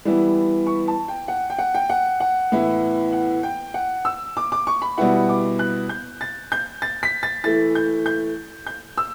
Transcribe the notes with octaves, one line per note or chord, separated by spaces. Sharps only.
E3 G3 B3 E4
C#6
A5
G5
F#5
G5
F#5
G5
F#5
F#5
A2 E3 B3 E4
F#5
G5
F#5
E6
D6
D6
C#6
B5
B2 G3 B3 E4 F#5
D6
F#6
G6
A6
G6
A6
B6
A6
E3 A3 E4 A6
G6
G6
G6
E6